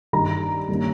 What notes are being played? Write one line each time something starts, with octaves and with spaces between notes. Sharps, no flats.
G2 D#3 G3 A#5
G2 D#3 G3 A#3 C#4